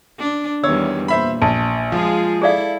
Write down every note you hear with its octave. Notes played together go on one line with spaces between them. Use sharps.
D4
E2 D#3 G3 C#5 E6
A#2 C5 E5 B5
A#1 A5
F3 G#3 F4 G#4
E4 G#4 A4 D5 F5